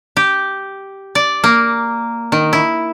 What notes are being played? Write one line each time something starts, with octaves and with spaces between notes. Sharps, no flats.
G4
D5
A#3
D#3
E4